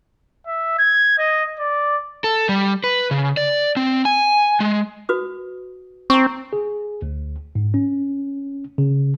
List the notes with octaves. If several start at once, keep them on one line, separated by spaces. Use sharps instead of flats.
E5
G#6
D#5
D5
A4
G3
B4
C#3
D5
C4
G#5
G#3
F#4 B4 D#6
C4 A#5 C#6
G#4
D2
G#2
C#4
C#3